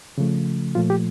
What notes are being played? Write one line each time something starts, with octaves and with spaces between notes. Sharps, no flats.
C#3 F3 A3
A#2 F3 A3 F4
G4